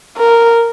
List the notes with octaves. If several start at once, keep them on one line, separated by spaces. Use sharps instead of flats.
A#4